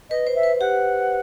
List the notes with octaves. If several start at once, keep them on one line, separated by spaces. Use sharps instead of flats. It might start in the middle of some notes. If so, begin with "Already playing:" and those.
B4 D#5
C5
E5
B4
G4 F#5